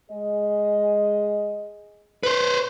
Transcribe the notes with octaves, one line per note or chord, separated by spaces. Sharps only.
G#3 G#4 D#5
B4 C5